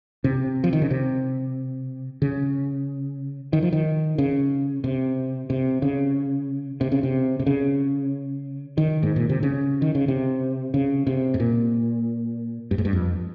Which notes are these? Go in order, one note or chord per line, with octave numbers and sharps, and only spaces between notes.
C3
F3
D#3
C#3
C3
C#3
D#3
F3
D#3
C#3
C3
C3
C#3
C3
C#3
C3
C3
C#3
D#3
G#2
A#2
C3
C#3
D#3
C#3
C3
C#3
C3
G#2
A#2
G2
G#2
G2
F2